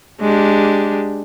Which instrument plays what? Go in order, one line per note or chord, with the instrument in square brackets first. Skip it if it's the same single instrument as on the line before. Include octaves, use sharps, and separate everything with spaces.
[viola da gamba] G#3 D4 G4